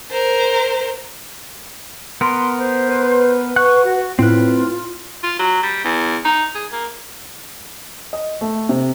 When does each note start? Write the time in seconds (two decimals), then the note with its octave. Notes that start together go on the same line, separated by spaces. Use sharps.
0.11 A#4 C5
2.21 B3 A#4 C6
2.58 C5
2.89 B4
3.56 F#5 C#6 F#6
3.84 F#4
4.19 A2 C4 F4 B4
5.23 F4
5.39 F#3
5.63 G3
5.84 E2
6.25 D#4
6.55 G#4
6.72 A#3
8.13 D#5
8.41 A3
8.69 C3